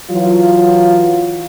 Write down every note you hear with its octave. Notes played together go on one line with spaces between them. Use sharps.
E3 F#3 F4